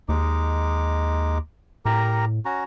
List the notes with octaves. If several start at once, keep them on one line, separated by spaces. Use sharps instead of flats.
D#2 G#3 D#4 D6
A2 G4 A#4 A#5
C#4 F#4 A#5